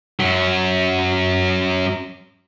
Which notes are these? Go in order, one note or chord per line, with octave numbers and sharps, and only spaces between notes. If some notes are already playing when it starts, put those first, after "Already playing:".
F#2 F#3